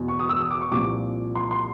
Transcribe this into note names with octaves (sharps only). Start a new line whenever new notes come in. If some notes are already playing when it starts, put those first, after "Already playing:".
Already playing: E2 B2
C#6
D#6
E6
D#6
D6
C#6
C2 A#2 F3 D6
C6
C6